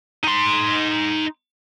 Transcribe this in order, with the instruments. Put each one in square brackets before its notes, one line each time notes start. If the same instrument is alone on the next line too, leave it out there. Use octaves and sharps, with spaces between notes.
[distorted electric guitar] D#4 C6